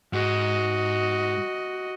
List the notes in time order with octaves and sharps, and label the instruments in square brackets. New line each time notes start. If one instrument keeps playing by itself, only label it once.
[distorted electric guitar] G#2 [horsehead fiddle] F#4 D#5